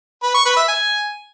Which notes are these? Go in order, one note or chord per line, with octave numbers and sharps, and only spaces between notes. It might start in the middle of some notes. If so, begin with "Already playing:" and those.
B4
C#6
B4
E5
G#5